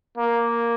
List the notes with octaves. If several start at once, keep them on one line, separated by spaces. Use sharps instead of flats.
A#3